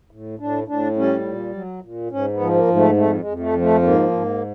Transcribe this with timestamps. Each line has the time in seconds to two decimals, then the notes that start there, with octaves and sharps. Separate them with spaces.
0.11 A2
0.39 A2 D4
0.68 A2 D4
0.96 G3 C#4
1.25 A#2
1.54 F#3
1.82 A#2
2.11 G#2 C#4
2.33 B3
2.40 F3
2.54 A#3
2.68 G#2
2.76 A3
2.97 F2 A3
3.18 G#3
3.25 F2
3.40 A3
3.54 F3
3.62 A3
3.82 G#2 A#3
4.11 G#2